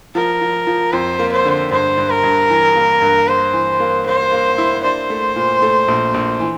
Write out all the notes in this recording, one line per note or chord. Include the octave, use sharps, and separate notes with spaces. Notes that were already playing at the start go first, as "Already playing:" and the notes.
F3 A#4
F3
F3
F2 C5
A#3
C5
D3
G2 C5
G2
A#4
G2
E3
A#3
G2
A#3 C5
E3
A#3
A#3 C5
A#3
E4
D4 C5
A3
A#2
A3
A#1
A#1
E3